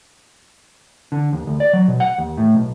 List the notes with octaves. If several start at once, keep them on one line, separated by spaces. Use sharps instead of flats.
D3
D#2
D2
D5
F#3
B2
F#5
D#2
A2
B1